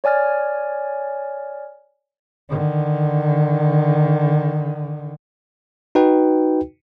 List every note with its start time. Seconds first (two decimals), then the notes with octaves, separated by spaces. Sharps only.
0.04 C#5 D5 G#5 F6 A6
2.49 D3 D#3
5.95 D#4 F#4 B4 G5